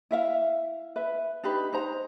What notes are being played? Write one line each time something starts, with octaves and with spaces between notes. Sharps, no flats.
E4 E5 F5
B4 E5
D4 D#4 G4 B4
D#4 C5 A#5